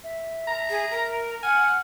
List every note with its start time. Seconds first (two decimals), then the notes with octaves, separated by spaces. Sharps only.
0.04 E5
0.47 A#5
0.70 G#4
0.91 A#4
1.43 F#5 G#5 F6